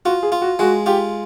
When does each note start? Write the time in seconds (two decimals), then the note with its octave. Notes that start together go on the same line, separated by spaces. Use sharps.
0.05 F4 F#4
0.23 G#4
0.32 F4
0.42 F#4
0.59 G#3 F#4
0.86 F4 G4